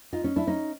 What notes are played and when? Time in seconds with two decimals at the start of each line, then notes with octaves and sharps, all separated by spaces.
0.13 D#4 F4
0.24 C#4 D#4
0.36 D4 E4
0.47 C#4 D#4